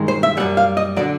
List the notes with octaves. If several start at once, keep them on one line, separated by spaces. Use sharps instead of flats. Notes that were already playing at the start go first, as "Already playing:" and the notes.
Already playing: G2 D#3 G#3
C5
E5
F#2 D#3 G3 F#5
F5
D#5
D3 F#3 D5